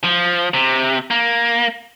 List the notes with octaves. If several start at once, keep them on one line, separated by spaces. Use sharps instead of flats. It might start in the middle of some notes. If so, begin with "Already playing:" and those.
F3
C3
A#3